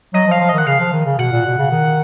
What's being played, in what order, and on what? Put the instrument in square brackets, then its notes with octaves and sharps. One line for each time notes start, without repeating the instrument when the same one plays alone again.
[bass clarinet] F#3 [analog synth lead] D#5
[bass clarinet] F3
[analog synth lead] F5
[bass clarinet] F3
[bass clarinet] D#3 [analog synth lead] D#5
[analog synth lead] F#5
[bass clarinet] C#3 [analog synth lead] F5
[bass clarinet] F3
D#3
C#3
[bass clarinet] B2 [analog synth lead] F#5
[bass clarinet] A#2
B2
C#3
D#3